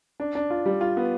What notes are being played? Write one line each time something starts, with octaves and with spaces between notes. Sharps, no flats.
D4
D4
F4
G3
F4
B3